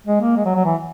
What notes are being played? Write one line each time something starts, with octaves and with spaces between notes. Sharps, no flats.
G#3
A#3
G#3
F#3
F#3
E3